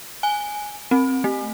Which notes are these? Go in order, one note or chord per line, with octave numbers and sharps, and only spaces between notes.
G#5
C4
A3